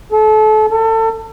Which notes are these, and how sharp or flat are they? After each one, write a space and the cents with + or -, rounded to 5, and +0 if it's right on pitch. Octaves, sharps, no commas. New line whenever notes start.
A4 -30
A4 +30